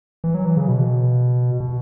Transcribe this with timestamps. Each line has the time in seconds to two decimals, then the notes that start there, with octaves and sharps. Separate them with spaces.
0.24 E3
0.35 F#3
0.45 E3
0.57 C#3
0.68 B2
1.60 B2